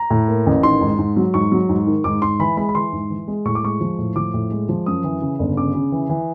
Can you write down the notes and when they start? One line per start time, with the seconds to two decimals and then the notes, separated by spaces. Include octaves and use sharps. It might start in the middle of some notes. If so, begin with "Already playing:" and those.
Already playing: A#5
0.10 A2
0.28 A#3
0.46 A1
0.63 D#3 C6
0.81 G#2
0.99 G#2
1.17 F#3
1.34 G#2 C#6
1.52 F#3
1.69 G#2
1.87 D#3
2.04 G#2 D6
2.22 G#2 C6
2.40 E3 B5
2.57 G#3 B5
2.69 B5
2.75 E3 C6
2.93 G#2
3.10 E3
3.28 G#3
3.45 A2 C#6
3.55 D6
3.63 G#3 C#6
3.81 F3
3.98 A2
4.16 F3 D6
4.34 A2
4.51 G#3
4.69 F3
4.86 F#2 D#6
5.04 E3
5.22 C#3
5.39 G1
5.57 C#3 D6
5.75 C#3
5.92 E3
6.09 E3